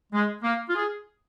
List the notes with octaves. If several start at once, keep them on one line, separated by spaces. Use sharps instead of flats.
G#3
A#3
F4
G#4